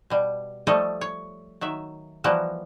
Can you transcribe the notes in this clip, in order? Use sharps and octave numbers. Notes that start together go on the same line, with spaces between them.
B2 G3
F3 G3 A3 A4 C#5 D#5
C#5
D#3 F#3 E5
E3 F3 G3 A#3 F#4 A#4